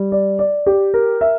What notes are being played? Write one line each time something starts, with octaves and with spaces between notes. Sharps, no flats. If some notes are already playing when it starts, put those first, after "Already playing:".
Already playing: G3
D5
D5
G4
A#4
E5